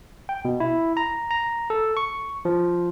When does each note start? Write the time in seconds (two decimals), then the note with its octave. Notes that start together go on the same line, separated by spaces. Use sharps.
0.29 G5
0.45 B2
0.60 E4
0.97 A#5
1.31 A#5
1.70 A4
1.97 C#6
2.45 F3